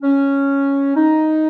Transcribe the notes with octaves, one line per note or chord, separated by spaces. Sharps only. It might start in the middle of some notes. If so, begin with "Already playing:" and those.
C#4
D#4